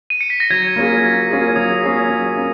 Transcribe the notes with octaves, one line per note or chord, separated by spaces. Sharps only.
D#7
C#7
B6
A#6
F#3 G#6
A#3 C#4 F4 G#4
F#3
A#3 C#4 F4 G#4
F#3 D#6
A#3 C#4 F4 G#4
F#3
A#3 C#4